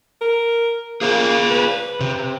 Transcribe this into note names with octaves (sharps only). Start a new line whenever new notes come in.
A#4
A#3 G#4 C5 F5
B4
C3